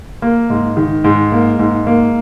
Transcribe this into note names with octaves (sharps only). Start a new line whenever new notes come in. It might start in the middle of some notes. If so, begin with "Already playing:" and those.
A#3
G#2
D#3
G#2
A#3
G#2
A#3